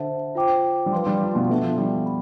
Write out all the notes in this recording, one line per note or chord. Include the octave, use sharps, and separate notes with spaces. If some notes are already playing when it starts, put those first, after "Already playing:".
Already playing: D3 C5 E5 A5
F4 C5 G5 D6
G3
F3 B4 F5 C6
G3
F3
B2
B2 D4 A4 E5 A5
F3
G3
B5